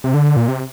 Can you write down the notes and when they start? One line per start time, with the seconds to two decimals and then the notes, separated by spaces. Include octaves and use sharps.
0.04 C3
0.14 D3
0.36 A#2
0.48 C3